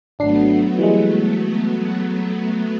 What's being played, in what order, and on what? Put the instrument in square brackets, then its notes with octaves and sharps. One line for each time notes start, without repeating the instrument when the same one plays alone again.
[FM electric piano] G#1 D4 C7 [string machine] F#3 A3 B3
[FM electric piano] E3 G3 G#3